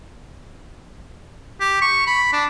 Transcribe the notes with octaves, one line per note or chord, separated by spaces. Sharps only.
G4
C#6
B5
D4